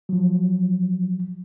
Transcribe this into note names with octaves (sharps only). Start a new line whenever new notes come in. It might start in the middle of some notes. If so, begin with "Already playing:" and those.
F3 F#3